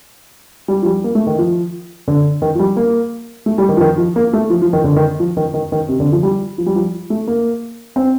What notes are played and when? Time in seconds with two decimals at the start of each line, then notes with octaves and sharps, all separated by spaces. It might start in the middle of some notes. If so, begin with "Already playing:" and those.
0.68 G3
0.82 F3
0.86 G3
1.04 A#3
1.15 A3
1.27 D#3
1.39 F3
2.08 D3
2.42 D#3
2.55 F3
2.59 G3
2.77 A#3
3.46 A3
3.58 G3
3.69 D#3
3.77 F3
3.81 D#3
3.97 F3
4.16 A#3
4.33 A3
4.50 F3
4.62 F3
4.73 D#3
4.84 D3
4.96 D#3
5.20 F3
5.37 D#3
5.54 D#3
5.72 D#3
5.88 C3
6.00 D3
6.12 F3
6.23 G3
6.58 F3
6.66 G3
6.75 F3
7.10 A3
7.27 A#3
7.96 C4